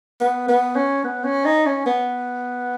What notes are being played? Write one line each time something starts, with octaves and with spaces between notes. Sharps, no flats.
B3
B3
C#4
B3
C#4
D#4
C#4
B3